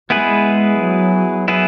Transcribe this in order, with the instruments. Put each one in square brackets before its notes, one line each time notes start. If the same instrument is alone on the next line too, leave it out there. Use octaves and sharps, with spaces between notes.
[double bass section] G#3 [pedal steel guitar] B3 E4 G#4 B4
[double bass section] F#3
[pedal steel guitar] B3 E4 G#4 B4